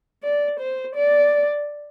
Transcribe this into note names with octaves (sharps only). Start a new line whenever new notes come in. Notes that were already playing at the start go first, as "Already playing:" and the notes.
D5
C5
D5